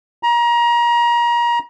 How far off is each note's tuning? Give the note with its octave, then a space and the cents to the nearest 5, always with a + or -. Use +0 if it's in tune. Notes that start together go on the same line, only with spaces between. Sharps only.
A#5 +30